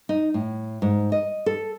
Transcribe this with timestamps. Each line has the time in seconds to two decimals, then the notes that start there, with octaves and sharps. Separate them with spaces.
0.09 D#4
0.34 A2
0.82 G#2
1.12 D#5
1.46 A4